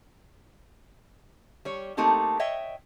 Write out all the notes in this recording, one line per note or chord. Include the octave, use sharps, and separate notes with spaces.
G3 C#5
A3 A#3 C4 D#4 G4 A4
C#5 D#5 E5 G5